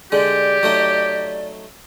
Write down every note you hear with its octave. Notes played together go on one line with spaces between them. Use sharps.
D3 G#3 G4 D5
F#3 A3 D#4